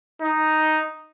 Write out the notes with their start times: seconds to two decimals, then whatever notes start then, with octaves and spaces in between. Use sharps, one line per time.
0.21 D#4